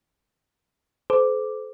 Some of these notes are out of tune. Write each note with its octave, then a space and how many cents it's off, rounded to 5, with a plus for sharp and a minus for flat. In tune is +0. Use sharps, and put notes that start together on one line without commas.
A4 -40 C5 -35 D6 +0